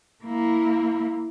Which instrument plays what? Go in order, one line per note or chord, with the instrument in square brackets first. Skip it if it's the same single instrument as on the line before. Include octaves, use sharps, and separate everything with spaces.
[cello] A#3 E4